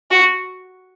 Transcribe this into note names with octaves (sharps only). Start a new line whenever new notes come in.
F#4